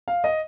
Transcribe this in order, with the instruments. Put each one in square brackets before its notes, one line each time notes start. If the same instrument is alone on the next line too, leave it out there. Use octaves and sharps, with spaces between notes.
[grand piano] F5
D#5